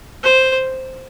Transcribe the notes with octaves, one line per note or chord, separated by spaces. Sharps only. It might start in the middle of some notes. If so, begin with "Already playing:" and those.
C5